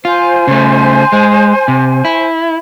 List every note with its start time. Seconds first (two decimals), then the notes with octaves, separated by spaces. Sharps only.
0.05 F4 C5 G#5
0.47 C#3 A3
1.12 G#3
1.68 C3
2.05 E4